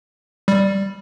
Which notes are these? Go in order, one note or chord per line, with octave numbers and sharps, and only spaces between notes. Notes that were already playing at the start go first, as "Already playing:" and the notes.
G3